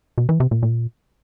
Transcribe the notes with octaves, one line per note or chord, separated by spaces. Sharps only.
B2
E3
C3
A#2
A#2